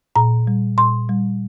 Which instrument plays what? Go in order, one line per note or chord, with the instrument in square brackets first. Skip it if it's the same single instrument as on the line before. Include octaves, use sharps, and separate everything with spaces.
[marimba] A#2 A#5
G3
A#2 C6
G3